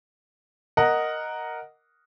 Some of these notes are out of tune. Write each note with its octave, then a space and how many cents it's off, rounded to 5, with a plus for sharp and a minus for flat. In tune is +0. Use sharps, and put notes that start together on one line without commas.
A#4 +0 D#5 +0 F#5 +0